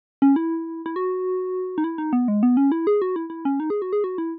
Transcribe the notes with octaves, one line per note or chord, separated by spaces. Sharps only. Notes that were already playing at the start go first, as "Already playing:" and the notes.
C#4
E4
E4
F#4
D#4
E4
D#4
B3
G#3
B3
C#4
E4
G#4
F#4
E4
E4
C#4
D#4
G#4
F#4
G#4
F#4
E4